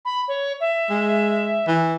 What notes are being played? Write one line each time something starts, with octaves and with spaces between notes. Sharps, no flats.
B5
C#5
E5
G#3
E3